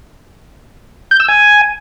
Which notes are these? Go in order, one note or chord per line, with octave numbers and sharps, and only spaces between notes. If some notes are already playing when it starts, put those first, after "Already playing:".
G6
E6
G#5